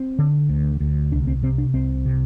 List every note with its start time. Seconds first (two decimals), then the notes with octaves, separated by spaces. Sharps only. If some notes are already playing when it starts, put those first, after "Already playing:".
Already playing: C4
0.19 D3
0.49 D2
0.80 D2
1.12 C2 D4
1.27 C4
1.43 C3 C4
1.58 D4
1.74 C2 C4
2.06 C3